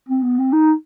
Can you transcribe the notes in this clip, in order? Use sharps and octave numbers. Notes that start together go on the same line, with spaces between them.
C4
B3
C4
D#4